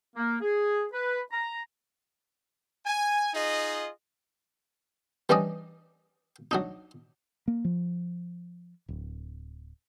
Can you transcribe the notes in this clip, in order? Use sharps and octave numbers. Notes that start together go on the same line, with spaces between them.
A#3
G#4
B4
A#5
G#5
D#4 F4 G#4 D#5
E3 G3 C#4 D4 D5 D#5
F#3 D4 D#4
A#3
F3
D1